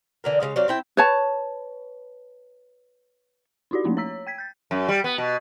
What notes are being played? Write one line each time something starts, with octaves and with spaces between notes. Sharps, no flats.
D3 E3 A#4
C#3 E3 G#3 F5
F#3 C4 D5 F5
C4 E4 G5
B4 C#5 A5
D#4 E4 F#4 G4 D5
F3 A3 A#3 C#4 D#4 E4
C#5 A#5 E6 B6
G5 G#6 B6
G6 A6
F#2
G3
B3
B2